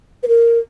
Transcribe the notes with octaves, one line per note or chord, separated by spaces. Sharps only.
B4
A#4